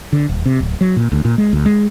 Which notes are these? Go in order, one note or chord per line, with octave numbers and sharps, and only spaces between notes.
D3
D#1
C3
D1
F#3
A#2
D2
A#2
G#3
D2
G#3